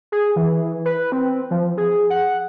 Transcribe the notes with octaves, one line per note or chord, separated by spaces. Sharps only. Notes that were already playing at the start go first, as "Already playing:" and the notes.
G#4
E3
B4
C4
F3
G#4
F#5